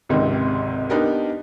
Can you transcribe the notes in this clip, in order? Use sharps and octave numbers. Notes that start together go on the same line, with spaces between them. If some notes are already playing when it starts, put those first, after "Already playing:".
G#1 C#2 G#2 C3 D#3
B3 D4 D#4 G4 A#4